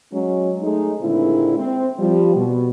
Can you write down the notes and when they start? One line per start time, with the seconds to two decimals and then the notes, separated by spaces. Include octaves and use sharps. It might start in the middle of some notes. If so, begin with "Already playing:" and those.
0.12 F#3 G#3 C#4
0.61 G#3 A3 D#4
1.01 A#2 D3 D#3 G#3 C4 E4
1.58 C4
1.99 F3 G3
2.35 B2